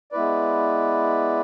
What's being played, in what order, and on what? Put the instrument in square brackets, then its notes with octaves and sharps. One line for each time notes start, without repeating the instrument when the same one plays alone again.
[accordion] G#3 B3 E4 B4 D5